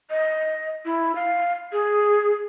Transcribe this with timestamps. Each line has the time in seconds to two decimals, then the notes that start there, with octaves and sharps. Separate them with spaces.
0.10 D#5
0.85 E4
1.15 F5
1.72 G#4